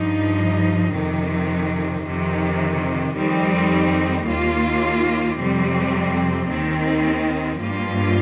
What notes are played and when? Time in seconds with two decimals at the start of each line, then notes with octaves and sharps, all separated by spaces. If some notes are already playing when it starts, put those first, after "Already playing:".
Already playing: G2 F3 D#4
0.95 F2 C3 D#3
2.05 F2 C3 D#3
3.16 F2 D#3 G3 C4 D#4
4.27 D#2 D#3 A#3 F4
5.38 F2 C3 G3 C4
6.49 D#2 D#3 C4
7.58 G2 F3 A#3 F4